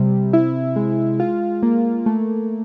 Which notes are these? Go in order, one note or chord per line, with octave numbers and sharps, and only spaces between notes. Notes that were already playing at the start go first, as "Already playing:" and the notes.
Already playing: C3 G3
E4
G#3
F4
A#3
A3